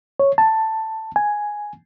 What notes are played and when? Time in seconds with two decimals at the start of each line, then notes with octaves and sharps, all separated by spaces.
0.20 C#5
0.38 A5
1.16 G#5